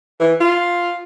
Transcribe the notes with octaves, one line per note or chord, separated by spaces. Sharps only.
E3
F4